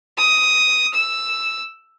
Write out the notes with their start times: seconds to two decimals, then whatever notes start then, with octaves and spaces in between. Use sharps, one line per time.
0.18 D#6
0.94 E6